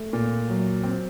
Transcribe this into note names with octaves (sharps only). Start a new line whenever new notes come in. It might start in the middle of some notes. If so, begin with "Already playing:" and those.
Already playing: A3
A#2
F#3
C4